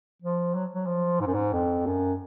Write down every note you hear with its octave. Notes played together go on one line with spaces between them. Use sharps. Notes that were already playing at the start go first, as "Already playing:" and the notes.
F3
F#3
F#3
F3
G#2
F#2
G#2
F2
F#2